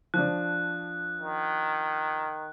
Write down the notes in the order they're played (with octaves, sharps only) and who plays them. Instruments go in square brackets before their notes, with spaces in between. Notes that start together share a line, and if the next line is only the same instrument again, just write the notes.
[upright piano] F3 D4 [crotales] F#6
[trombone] D#3